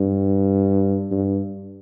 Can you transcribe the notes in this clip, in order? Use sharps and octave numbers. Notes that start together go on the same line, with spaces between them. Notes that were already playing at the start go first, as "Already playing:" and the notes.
Already playing: G2
G2